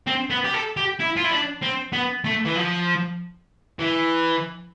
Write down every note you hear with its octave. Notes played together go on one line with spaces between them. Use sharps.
C4
B3
G4
A4
G4
E4
F4
E4
D4
C4
B3
A3
E3
F3
E3